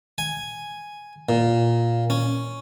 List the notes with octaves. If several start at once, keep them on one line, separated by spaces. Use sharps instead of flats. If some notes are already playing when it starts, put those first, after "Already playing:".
G#5
A#2
C#4